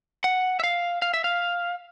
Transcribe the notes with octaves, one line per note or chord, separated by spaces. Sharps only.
F#5
E5
F5
F5
E5
F5